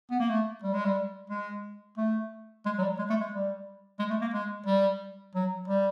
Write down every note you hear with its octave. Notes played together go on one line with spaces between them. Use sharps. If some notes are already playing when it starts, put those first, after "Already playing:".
B3
A#3
A3
G3
G#3
G3
G#3
A3
G#3
F#3
G3
G#3
A3
G#3
G3
G#3
A3
A#3
G#3
G3
F#3
G3